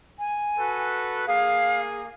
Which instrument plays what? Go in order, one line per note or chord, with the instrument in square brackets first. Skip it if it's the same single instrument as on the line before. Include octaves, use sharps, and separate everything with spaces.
[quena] G#5
[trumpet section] F#4 A4 B4
[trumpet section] A#3 G#4 [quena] F5